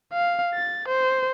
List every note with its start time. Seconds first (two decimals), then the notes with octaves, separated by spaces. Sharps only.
0.13 F5
0.54 A6
0.88 C5